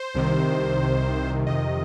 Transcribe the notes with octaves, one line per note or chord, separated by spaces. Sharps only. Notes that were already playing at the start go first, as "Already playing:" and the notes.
Already playing: C5
C2 C3 D#3
F2 C3 D#3 D#5